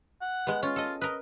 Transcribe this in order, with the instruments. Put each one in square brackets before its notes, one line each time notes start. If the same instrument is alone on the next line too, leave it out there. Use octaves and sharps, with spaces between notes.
[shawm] F#5
[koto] G#3 B3
[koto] C#4 [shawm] F4
[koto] A4 D#5
[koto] A#4 B4 [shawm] D#5